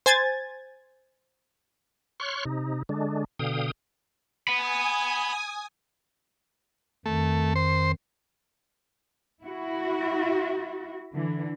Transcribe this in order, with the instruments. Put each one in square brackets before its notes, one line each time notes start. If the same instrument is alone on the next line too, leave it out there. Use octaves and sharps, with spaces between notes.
[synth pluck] C5 G#5 G#6 A6
[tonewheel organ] C#5 C6 C#6 F6 F#6
C3 D#4
D3 G#3 D4
B2 D3 F5 G5 D#6
[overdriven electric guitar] F#5 B5 [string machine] G#5 D#6
[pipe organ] F2 D#3 [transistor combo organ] A3
[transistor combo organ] C5
[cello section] E4 F#4
D3 E3